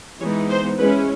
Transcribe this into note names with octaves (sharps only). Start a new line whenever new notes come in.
E3 G#3 B3 D#4 C#5
C5
G#3 C#4 E4 B4